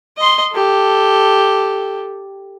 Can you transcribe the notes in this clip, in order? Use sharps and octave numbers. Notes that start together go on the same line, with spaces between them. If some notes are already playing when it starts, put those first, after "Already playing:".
D#5 C6
G4 A4